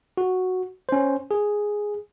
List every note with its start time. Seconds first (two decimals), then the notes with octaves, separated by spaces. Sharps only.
0.17 F#4
0.89 C#4 C5
1.31 G#4